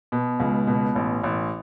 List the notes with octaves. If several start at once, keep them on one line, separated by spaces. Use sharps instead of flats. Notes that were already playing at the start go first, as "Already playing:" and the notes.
B2
C#2
B2
A1
A1